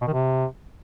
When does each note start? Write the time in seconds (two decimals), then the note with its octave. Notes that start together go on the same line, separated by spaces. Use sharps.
0.02 B2
0.07 D#3
0.13 C3